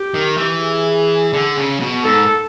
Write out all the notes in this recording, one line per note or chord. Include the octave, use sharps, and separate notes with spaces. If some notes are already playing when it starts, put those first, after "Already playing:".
Already playing: G4
D#3
E3
G#4
D3
C#3
B2
G#2 A4